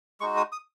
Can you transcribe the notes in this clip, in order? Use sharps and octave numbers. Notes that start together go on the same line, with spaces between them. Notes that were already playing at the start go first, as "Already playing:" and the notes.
G#3 D#4 F#4 C#6
D#6
D#6